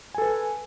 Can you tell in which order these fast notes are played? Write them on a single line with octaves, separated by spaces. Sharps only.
G#5 A4 B4